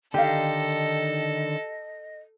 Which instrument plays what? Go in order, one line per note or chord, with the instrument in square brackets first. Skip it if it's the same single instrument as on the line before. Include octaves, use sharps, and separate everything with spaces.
[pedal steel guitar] D3 D#3 D#4 [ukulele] G4 F5 [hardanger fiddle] A4 [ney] D#5